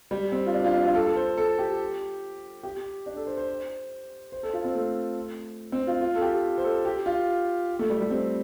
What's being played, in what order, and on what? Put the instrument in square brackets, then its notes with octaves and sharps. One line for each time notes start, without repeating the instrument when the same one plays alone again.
[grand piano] G3
C4
F4
D4
F4
D4
F4
A4
A4
C5
A4
G4
G4
D4
A4
C5
C5
C5
A4
F4
C4
A3
C4
F4
F4
A4
G4
C5
A4
G4
F4
A3
G3
G3
C4